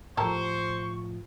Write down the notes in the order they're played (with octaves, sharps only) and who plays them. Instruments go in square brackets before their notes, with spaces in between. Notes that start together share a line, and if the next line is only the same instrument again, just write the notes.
[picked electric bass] A2 F3 [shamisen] G4 A4 A#4 [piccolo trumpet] C5 [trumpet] C#6